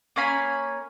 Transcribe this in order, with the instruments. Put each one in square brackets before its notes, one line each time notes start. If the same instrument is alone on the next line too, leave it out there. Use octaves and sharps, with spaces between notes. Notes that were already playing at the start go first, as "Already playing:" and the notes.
[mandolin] A#3 C#4 G#5 B5